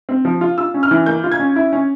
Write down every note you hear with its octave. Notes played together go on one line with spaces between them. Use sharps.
C4
F3
F4
F4 E6
C#4
F6
E3
A#3 G6
F4
G#6
C#4
E4
C#4